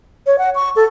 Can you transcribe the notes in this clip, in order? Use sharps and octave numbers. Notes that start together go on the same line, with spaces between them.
C#5
F#5
C#6
A4